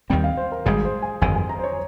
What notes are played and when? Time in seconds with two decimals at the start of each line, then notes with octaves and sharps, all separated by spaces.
0.10 D#2 D#3 G3 C4 G5
0.24 F5
0.37 C5
0.52 A#4
0.66 G#1 G#2 G3 G#4
0.85 C5
1.02 G#5
1.21 G1 F2 D#3 G#5
1.35 G#5
1.49 A#5
1.59 C5
1.64 C#5